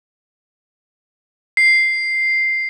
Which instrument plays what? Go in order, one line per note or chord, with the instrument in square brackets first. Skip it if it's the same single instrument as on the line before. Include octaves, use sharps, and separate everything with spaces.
[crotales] C7